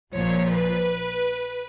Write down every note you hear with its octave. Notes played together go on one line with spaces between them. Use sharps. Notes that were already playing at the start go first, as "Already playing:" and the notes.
A#1 A#2 F3 C#5
B4